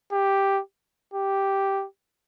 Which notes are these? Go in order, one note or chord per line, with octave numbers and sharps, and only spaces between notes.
G4
G4